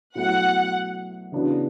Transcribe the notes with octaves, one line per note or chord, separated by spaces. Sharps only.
B2 F#3 A3 E4 F#5
C#3 E3 B3 D4 F#4